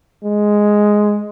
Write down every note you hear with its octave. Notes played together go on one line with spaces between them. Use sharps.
G#3